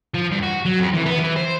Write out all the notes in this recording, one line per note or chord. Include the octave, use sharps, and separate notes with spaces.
F3
G2
F#4
F#3
F2
E3
B3
E3
C5